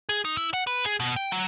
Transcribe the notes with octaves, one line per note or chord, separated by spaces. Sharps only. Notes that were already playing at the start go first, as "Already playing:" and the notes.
G#4
D#4
E4
F#5
B4
G#4
B2
G5
F#3